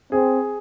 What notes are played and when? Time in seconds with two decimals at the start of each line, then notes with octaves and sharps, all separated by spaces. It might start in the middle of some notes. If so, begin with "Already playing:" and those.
0.12 C4 G#4